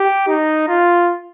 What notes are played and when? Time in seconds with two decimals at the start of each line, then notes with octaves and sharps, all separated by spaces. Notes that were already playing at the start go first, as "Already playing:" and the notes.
Already playing: G4
0.28 D#4
0.68 F4